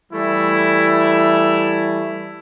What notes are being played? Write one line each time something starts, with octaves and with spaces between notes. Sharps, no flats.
E3 G3 A3 E4